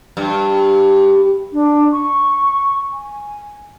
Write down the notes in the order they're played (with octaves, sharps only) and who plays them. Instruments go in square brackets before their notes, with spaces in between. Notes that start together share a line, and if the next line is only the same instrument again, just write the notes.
[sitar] G2
[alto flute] D4
C#6
G#5